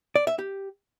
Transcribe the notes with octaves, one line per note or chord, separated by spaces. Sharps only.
D5
E5
G4